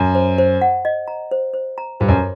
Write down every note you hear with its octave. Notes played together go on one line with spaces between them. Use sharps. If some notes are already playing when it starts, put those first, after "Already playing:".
Already playing: F#2
C5
C5
F#5
D#5
A#5
C5
C5
A#5
G2 C5
F#2